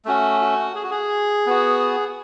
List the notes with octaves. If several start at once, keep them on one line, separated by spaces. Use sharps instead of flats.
A3 C#4 F#4
F#4
G#4
F#4
G#4
B3 F#4